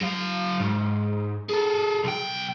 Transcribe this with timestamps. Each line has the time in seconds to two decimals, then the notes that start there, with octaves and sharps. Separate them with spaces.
0.01 F#3 F5
0.59 G#2
1.49 G#4 A4
2.04 B1 G5